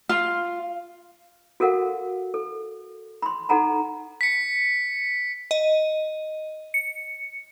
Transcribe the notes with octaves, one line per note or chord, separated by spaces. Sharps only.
F4
F#4 A4 A#4 F5 F#5
A4
B5 C6
D#4 A4 F#5 A#5 B5
B6 C#7
D#5
C#7